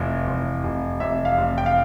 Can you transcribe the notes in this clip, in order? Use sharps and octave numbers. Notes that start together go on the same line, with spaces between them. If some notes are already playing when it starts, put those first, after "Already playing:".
Already playing: F1 E3
F1
F1
F1 E5
F5
F1
G5
F5